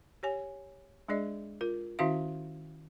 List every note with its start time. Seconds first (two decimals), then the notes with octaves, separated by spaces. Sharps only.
0.23 G4 C#5 G#5
1.08 G#3 D4 G#4 D5 D#5
1.61 F4 A#4
1.99 D#3 C#4 E4 F#4 E5 F5